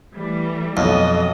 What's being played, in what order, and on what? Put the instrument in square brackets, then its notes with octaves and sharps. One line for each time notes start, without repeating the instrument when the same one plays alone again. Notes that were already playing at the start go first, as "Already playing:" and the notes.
[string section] E3 G3 A3
[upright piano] B1 [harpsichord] F2 [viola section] D#5